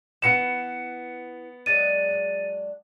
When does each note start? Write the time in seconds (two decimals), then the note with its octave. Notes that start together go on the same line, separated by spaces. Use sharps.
0.22 E3 B3 B4 C#7 E7
1.66 F#3 G#3 D4 A6 D#7